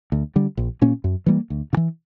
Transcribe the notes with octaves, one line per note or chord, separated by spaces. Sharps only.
D2
D3 G3
A#1
A#2 A#3 C#4
F#2
E3 G3 A#3
D2
C#3
E3